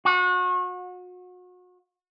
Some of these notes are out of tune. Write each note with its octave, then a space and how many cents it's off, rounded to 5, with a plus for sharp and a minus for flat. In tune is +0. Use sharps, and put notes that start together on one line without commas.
F#4 -35